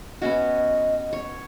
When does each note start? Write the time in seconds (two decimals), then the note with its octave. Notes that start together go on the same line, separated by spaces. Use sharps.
0.22 B3 C#4 F#4 D#5
1.13 C#5